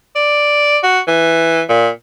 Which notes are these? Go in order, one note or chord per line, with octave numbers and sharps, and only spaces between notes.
D5
F#4
E3
A#2